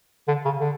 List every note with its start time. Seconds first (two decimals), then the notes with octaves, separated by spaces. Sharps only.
0.28 D3
0.45 C#3
0.60 D3